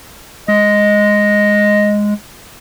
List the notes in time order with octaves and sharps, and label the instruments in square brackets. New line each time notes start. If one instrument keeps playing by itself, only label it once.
[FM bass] G#3 [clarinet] D#5